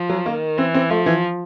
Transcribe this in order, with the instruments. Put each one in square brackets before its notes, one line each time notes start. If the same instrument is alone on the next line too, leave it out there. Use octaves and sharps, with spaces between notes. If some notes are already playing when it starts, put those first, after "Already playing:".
Already playing: [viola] F3
[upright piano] F#3
[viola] D#3 [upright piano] A#3
[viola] E3 [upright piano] C4
[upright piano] C4
[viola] F3 [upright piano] A3
[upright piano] E3